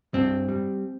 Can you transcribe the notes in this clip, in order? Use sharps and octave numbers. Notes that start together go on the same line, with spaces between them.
G2 C4
G3